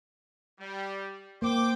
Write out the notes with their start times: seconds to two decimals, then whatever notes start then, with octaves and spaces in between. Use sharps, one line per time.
0.59 G3
1.42 A#3 C5 G5 D6